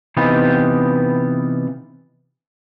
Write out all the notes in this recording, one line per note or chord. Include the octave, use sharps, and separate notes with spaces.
C3 E3 B3 D#4 F4 G4